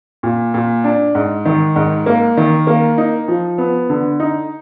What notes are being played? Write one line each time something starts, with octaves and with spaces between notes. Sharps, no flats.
A#2
A#2
D4
G#2
D#3
G#2
A#3
D#3
A#3
D#4
F3
B3
D3
D#4